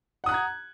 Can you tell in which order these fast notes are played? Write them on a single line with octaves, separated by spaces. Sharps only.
F#5 D#6 F#6 A#5 G#6